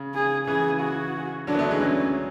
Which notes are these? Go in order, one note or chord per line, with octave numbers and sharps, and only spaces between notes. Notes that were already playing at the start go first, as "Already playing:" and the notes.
Already playing: C#3
G#4
C#3 E3 G#4
F#4
D3 F#3 D4
B3
F#3 A3
E3 G#3
F#3 A3 C#4